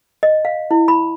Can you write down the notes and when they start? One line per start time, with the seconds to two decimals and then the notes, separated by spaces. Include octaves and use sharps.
0.23 D#5
0.45 F5
0.71 E4
0.88 B5